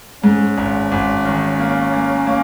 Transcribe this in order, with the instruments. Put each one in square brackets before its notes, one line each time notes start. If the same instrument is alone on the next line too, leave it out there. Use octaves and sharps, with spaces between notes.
[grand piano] G#2 [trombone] C#4
[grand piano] G#1
G#1
D#3
A#3
A#3
A#3